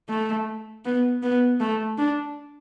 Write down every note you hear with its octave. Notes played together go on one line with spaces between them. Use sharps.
A3
B3
B3
A3
D4